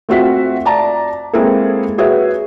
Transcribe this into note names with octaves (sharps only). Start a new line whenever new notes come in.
A3 C4 F4 F#4 E5 B6
D5 A5 A#5
G#3 A#3 C4 E4 G#4 A4
F#4 G#4 B4 C#5 E5